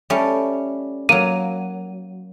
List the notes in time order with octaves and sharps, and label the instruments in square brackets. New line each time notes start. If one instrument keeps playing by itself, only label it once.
[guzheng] G3 A3 C#4
[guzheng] F#3 A#3 [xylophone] D#7